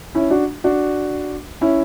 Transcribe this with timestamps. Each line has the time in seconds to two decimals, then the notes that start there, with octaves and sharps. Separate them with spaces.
0.14 C#4 E4
0.31 D4 F#4
0.64 D4 F#4
1.61 C#4 E4